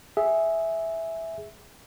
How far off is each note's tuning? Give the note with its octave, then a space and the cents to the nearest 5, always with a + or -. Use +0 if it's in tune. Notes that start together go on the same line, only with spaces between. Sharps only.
G#4 +0 E5 -5